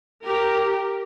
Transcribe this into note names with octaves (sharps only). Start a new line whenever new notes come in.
G4 A#4